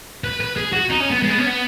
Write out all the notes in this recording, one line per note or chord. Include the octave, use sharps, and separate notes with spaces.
B4
B4
G#4
F#4
D#4
C#4
B3
G#3
B3
C#4
B3